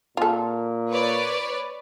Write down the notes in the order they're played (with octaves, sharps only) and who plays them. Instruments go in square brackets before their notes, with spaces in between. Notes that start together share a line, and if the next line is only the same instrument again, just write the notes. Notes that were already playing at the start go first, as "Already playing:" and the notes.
[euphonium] A#2 [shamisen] F4 A4
[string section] B4 C#5 D5